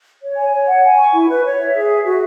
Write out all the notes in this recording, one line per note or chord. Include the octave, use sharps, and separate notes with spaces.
C#5
G#5
C#5
F#5
G#5
C#6
E4
B4
C#5
E5
G#4
E5
F#4